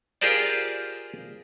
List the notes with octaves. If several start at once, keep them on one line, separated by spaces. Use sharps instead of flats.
F4 G4 G#4 A#4 C5 D5